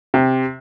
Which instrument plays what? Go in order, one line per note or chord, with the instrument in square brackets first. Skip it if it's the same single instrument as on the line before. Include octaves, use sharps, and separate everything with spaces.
[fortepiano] C3